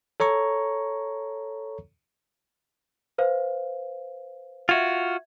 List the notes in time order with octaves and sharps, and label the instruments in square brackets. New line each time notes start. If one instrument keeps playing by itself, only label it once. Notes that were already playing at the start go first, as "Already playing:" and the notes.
[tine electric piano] A4 C#5 A#5 C#6
[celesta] B4 C5 F5
[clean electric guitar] F4 F#4 [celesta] E5 G#6